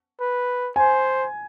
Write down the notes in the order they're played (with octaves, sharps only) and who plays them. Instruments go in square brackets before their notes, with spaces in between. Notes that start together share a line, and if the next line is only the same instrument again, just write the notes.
[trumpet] B4
[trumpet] C5 [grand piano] G#5